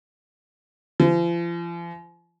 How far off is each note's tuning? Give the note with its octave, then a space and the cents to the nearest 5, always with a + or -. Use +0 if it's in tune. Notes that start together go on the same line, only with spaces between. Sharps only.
F3 -40